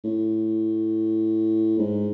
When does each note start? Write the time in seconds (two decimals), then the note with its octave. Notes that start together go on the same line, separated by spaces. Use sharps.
0.04 A2
1.78 G#2